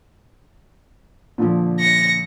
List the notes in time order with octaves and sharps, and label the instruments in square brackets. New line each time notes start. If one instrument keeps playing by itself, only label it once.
[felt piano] A#2 D3 F3
[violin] A#6 C#7